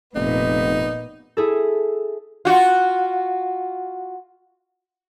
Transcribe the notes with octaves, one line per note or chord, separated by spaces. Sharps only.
F1 A#2 B3 D#4
E4 G#4 A4
F4 F#4